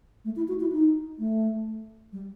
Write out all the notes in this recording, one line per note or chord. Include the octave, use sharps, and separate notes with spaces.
A3
E4
F#4
E4
D#4
A3
G3